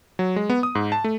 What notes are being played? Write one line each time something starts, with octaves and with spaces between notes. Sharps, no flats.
F#3
G#3
B3
D#6
G#2
A5
A3